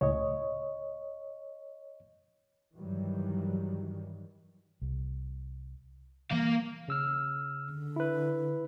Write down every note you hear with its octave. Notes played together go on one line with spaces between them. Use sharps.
C#2 A2 C#3 C#5 D#5
G2 D#3 E3 F#3 G3
C2
E3 G3 A#3 F5
C#3 E6 F6
D3
E4 B4